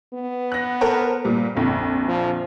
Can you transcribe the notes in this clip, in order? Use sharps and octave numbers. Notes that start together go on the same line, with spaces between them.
B3
F#6 A#6
A4 A#4 C5
A#2 G3
A#1 F2 D3
F3